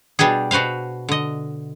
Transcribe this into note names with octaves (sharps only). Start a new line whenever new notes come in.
B2 G3 D4 G4 G#4
B2 F#4 B4 C5 F5
D3 D#5